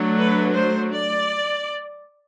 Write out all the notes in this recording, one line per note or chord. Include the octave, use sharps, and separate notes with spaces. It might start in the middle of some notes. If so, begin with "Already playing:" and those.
Already playing: F#3 A3 D4
B4
C5
D5